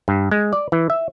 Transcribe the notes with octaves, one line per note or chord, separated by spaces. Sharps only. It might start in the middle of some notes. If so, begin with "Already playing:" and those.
G2
G#3
D5
E3
E5